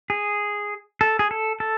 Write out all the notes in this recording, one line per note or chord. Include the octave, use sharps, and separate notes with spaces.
G#4
A4
G#4
A4
A4